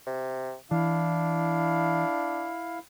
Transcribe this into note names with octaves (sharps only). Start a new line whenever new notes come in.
C3
E3 D4 E4 F5